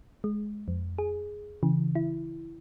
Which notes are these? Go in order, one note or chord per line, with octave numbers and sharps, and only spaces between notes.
G#3
F2
G#4
C#3 E3
E4